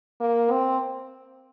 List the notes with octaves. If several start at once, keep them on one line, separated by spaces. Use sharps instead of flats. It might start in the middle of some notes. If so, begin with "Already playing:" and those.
A#3
C4